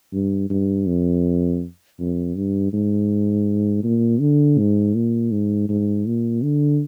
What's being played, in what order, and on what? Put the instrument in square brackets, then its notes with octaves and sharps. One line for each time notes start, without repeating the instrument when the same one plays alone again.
[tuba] G2
G2
F2
F2
G2
G#2
A#2
D3
G#2
A#2
G#2
G#2
A#2
D3